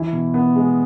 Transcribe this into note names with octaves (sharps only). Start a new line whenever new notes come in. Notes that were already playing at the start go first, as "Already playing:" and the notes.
Already playing: E3 E4
B2
B3
G#3